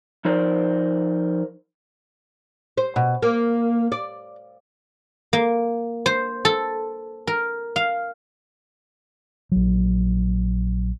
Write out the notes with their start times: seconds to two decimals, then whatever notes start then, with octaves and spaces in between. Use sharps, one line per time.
0.25 F3 D#4 A#4 C5 D5
2.77 C5
2.96 B2
3.22 A#3
3.92 D5
5.33 A#3
6.06 C5
6.45 A4
7.27 A#4
7.76 F5
9.52 A#1 F#3